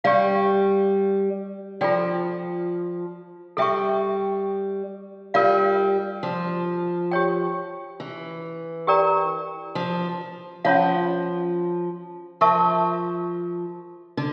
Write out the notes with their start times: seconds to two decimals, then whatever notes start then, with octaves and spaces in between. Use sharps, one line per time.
0.04 G3 G4 D5 F5
1.81 F3 F4 A4 D5 G5
3.57 G3 A4 E5 G5 C#6
5.34 G3 F4 A#4 D5 F5
6.23 F3
7.11 G4 C#5 G5
8.00 E3
8.87 G4 A#4 D5 G5 A#5
9.75 F3
10.65 F3 C#4 F4 C#5 F5
12.41 F3 A#4 E5 A5 C#6
14.17 D3